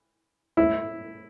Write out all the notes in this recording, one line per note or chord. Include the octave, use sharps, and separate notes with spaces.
E4